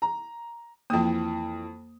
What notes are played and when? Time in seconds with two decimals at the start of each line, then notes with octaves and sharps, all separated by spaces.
0.02 A#5
0.90 F2 E3 A#3 G5 D#6